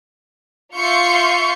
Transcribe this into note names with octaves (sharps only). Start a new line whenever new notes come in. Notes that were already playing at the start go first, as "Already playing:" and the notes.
F4 E5 C6 C#6 G6 C#7